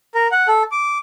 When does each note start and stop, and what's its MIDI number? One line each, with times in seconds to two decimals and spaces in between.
0.15 0.28 70
0.32 0.47 78
0.48 0.63 69
0.72 0.98 86